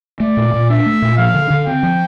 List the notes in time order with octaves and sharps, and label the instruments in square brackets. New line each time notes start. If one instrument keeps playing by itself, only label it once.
[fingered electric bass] A3 [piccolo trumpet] D5
[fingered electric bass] A#2
A#2
[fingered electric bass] D4 [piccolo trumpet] E5
[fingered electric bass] A3
A#2
[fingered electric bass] F3 [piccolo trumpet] F5
[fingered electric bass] D3
D3
[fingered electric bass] C4 [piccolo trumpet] G5
[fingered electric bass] F3